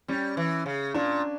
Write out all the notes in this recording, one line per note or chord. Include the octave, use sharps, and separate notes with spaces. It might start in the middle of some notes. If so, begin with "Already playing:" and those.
G3 C#4
E3
C#3
A#2 D4